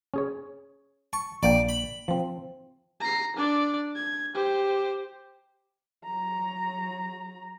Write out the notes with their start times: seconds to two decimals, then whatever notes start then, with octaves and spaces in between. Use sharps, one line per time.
0.14 C#4 G#4 C#5
1.13 A5 C#6
1.43 A#1 A#3 D5 G5
1.69 B5
2.08 F3 C4
3.01 A#5 C7
3.37 D4 D5
3.96 G#6
4.34 G4 C5
6.05 F#3 A#5